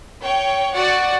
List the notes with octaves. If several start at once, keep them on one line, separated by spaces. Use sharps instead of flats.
C#5 G5
F#4 D5 F#5 C#6